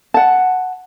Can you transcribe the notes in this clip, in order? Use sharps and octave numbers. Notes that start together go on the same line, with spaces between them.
F#5 A5